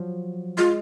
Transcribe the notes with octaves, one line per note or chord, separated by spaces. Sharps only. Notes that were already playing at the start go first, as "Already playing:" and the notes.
Already playing: F3 F#3
G#3 F4